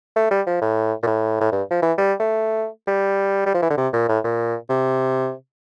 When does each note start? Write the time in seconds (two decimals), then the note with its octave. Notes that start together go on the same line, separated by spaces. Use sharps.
0.16 A3
0.31 G3
0.47 F3
0.62 A2
1.03 A#2
1.07 A2
1.41 A2
1.52 G2
1.71 F3
1.82 E3
1.98 G3
2.20 A3
2.87 G3
3.46 G3
3.54 F3
3.62 E3
3.70 D3
3.78 C3
3.93 A#2
4.09 A2
4.24 A#2
4.69 C3